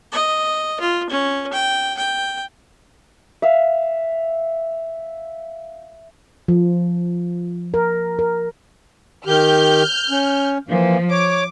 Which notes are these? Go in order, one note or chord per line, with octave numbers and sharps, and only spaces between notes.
D#5
F4
C#4
G5
G5
E5 F5
F3
A#4
A#4
D#3 G4 F6 G6
C#4
E3 F3 A#3
C#5 D6